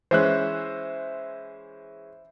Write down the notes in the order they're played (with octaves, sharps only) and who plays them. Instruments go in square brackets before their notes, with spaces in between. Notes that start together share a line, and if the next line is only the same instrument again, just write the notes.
[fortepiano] E3 G#3 C#4 [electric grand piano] C5 E5 F#6